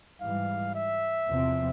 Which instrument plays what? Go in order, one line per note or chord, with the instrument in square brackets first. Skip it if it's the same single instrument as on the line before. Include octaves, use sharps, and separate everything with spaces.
[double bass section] G#2 E3 G3 [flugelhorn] F5
[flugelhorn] E5
[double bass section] E2 C3 F3 C4